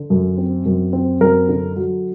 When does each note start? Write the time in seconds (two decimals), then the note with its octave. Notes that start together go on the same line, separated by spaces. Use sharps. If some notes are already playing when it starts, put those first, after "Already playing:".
Already playing: D3
0.10 F#2
0.38 C4
0.66 F#2
0.93 C4
1.21 F#2 A#4
1.49 D3
1.76 F#3